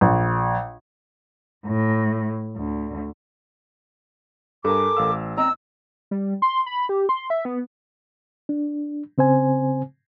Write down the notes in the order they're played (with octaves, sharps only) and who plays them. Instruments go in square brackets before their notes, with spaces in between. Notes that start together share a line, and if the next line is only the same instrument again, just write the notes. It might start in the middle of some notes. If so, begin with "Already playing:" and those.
[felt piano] A#1
[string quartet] A2
D2
[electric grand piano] G2 [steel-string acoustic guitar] A4 A#4 G#5 [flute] D6
[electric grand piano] A1 F5 E6
[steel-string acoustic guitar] C4 D#5 A#5 [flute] E6
[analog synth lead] G3
C6
B5
G4
C6
E5
B3
[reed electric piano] D4
C#3 C4 C5 G#5